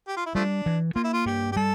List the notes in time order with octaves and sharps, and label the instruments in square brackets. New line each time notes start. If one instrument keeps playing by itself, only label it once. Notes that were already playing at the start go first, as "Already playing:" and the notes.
[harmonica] G4
F4
E4
[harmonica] F3 A3 D4 [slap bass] G3
[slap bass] E3
[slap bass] A#3 [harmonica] F4
[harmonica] E4
F4
[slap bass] G2 [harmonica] G4
[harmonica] G4
[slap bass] G3 [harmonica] A4